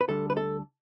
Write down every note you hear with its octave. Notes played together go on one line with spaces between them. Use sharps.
B4
D2 D3 G3 D4 A4
B4
A4